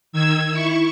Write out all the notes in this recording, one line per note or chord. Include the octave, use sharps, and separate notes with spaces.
D#3 E6 G#6
E4 C#6